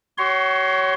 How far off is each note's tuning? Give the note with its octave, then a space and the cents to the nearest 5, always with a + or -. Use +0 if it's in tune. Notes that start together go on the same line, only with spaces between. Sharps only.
F#4 +40 C#5 +10 C6 +0